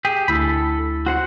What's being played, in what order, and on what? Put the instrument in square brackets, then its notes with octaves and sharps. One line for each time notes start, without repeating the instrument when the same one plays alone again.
[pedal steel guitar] G4 G#4
[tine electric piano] D2 E4 E6 [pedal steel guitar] A4 B5
[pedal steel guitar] F#4 C5 F#5